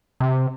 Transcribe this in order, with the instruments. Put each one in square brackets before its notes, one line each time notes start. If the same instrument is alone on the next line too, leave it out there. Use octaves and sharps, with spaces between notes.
[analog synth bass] C3